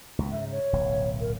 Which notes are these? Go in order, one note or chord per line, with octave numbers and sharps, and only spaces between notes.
C#2 B2
G#2 C#3 E5
C#5
D1 B1
A#4